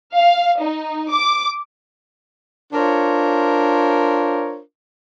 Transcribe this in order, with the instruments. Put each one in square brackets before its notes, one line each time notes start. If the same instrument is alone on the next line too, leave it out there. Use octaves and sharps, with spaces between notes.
[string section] F5
D#4
D6
[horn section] D4 F4 A#4 C5 C#5